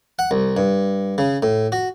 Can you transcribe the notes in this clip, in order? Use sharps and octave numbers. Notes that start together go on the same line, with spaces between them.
F#5
C2
G2
C#3
A2
F#4